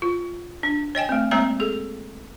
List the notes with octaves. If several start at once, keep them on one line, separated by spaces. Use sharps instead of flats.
F4
D4
C#5 D#5 G5 G#5
A3 C4
G#3 A#3 C4 C#5 E5 A#5
G#4 A4